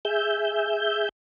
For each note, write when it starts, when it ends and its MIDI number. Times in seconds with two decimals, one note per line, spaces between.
0.05 1.09 68
0.05 1.09 76
0.05 1.09 91